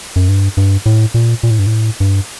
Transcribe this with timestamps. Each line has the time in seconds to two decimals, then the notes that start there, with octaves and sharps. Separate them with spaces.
0.16 F#2
0.28 G2
0.57 G2
0.86 A2
1.14 A#2
1.43 A#2
1.51 A2
1.59 G2
1.67 A2
2.00 G2